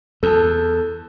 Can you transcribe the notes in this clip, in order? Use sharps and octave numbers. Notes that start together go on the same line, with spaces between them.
E2 A4 A5